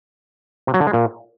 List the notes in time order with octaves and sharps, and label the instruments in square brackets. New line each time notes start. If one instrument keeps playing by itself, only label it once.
[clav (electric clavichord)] C3
F#3
D3
G#3
A#2